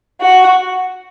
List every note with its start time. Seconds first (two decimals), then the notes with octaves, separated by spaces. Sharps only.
0.21 F#4